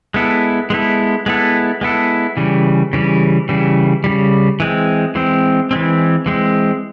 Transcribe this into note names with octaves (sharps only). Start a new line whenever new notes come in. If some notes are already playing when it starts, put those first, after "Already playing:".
G#3 B3 E4 A4
G#3 B3 E4 A4
G#3 B3 E4 A4
G#3 B3 E4 A4
C#3 E3 G3
C#3 E3 G3
C#3 E3 G3
C#3 E3 G3
E3 G#3 C4
E3 G#3 C4
E3 G#3 C4
E3 G#3 C4